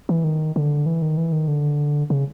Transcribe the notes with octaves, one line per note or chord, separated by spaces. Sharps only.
E3
D#3
D3
E3
D#3
E3
D#3
D3
C#3